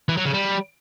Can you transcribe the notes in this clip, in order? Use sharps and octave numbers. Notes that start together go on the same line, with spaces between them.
E3
F#3
C#3
G3